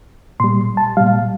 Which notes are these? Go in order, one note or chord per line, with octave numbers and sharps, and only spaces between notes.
A#2 G3 C6
A5
A#2 G3 F5